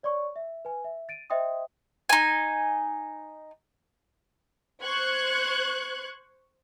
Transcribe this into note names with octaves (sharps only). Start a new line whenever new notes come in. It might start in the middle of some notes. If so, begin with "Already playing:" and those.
C#5 D5 C6 C#6
E5
B4 G#5
E5
A6 D7 D#7
C5 D#5 E5 G5 C6 D#6
D#4 G#5
C5 C#6 F#6 G#6